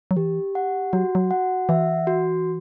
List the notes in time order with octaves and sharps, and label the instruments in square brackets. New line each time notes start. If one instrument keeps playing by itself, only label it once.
[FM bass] F#3
[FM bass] E3 [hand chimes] G4
[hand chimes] F#5
[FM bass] F#3 [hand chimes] F#4
[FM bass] F#3
[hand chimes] F#5
[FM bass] E3 [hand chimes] E5
[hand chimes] F#4